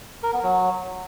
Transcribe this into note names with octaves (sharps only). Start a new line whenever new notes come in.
A#4
B3
F#3